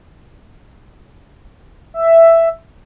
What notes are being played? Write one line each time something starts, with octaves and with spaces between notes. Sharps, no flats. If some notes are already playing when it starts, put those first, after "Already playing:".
E5